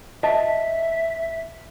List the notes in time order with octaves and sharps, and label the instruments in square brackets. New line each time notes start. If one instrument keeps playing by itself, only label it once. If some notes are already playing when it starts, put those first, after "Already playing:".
[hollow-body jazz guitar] D#5 A5 [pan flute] E5